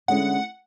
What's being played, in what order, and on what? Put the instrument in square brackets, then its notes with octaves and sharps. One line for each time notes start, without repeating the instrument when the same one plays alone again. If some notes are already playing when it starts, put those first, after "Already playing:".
[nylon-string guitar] D3 G#3 C#4 E4 [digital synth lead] F#5